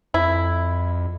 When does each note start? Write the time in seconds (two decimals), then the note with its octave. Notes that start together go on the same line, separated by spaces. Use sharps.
0.14 F2 E4